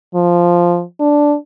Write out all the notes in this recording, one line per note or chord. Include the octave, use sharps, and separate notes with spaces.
F3
D4